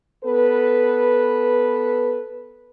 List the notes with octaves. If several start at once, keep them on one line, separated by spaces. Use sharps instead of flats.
B3 A4 B4